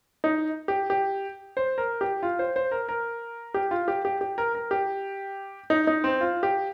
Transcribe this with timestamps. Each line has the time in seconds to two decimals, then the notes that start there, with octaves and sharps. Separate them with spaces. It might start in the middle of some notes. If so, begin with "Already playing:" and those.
0.24 D#4
0.68 G4
0.90 G4
1.57 C5
1.78 A#4
2.01 G4
2.23 F4
2.39 C5
2.56 C5
2.72 A#4
2.89 A#4
3.54 G4
3.71 F4
3.88 G4
4.05 G4
4.21 G4
4.38 A#4
4.55 A#4
4.71 G4
5.70 D#4
5.87 D#4
6.04 C4
6.21 F4
6.43 G4